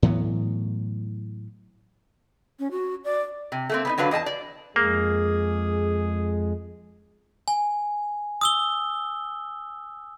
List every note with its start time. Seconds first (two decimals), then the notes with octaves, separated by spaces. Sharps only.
0.02 A2 E3 F#3 B3
2.59 C#4
2.71 F#4
3.04 D5
3.52 C3
3.69 A3 A#3 C4
3.85 B3 C#4 D#4
3.98 D3 F#3 D4 B4 F5
4.11 E2 D#5 G#5 A5
4.26 D5
4.76 F2 G#3 A#3 G#4
7.48 G#5
8.41 D#6 E6 G7